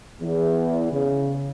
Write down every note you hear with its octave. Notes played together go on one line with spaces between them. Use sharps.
E2
C#3